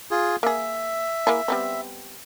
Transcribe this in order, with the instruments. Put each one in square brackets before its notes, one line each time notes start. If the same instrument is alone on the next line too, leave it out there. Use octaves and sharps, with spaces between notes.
[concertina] F4 G#4
[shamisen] A#3 G#4 [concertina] E5
[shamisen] A#3 E4 G#4
G3 B3 C4